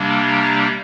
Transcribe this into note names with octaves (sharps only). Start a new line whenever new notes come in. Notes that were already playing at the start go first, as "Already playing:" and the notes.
Already playing: C3 G3 A#3 D4
A#5